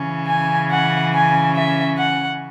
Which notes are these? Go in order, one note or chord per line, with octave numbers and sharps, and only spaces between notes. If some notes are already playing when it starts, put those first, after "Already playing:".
Already playing: C#3 E3 C#4
G#5
F#5
G#5
E5
F#5